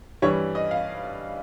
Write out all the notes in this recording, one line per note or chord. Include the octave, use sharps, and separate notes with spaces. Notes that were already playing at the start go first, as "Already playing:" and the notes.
G2 E3 G3 C#5
D#5
F5